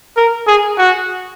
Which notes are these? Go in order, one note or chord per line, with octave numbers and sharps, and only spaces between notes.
A#4
G#4
F#4